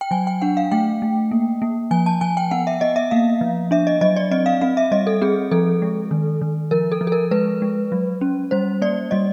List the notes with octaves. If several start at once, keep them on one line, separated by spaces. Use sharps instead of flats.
G5
F#3 G#5
G5
D4 F#5
F5
A3 G5
A3
A#3
A#3
F3 G#5
A5
F3 G#5
G5
B3 F#5
E5
B3 D#5
E5
A#3 F5
F3
D4 E5
D#5
F#3 D#5
D5
C4 D#5
F5
C4 F5
E5
G3 D#5
A4
C4 G#4
F3 A4
G#3
D#3
D#3
F3 A#4
A4
F3
A4
A#4
G#3 B4
G#3
F#3
C#4
G3 C5
A#3 D5
G3 D#5